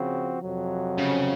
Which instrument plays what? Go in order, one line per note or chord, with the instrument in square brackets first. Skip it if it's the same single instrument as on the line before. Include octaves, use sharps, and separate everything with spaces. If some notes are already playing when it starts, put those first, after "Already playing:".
Already playing: [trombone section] C#3 F3 C4 F#4
F2 C3 F#3
[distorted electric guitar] C#3